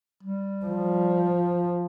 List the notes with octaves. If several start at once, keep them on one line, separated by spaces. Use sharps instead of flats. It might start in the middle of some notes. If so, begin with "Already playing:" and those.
G3
F3